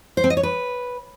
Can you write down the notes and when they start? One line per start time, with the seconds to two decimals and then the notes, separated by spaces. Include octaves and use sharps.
0.17 C5
0.24 C4
0.30 D#5
0.37 C#5
0.43 B4